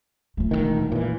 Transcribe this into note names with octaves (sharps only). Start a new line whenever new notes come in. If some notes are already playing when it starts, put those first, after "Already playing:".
F3 A3
E1 C2 D#3
A#2 E3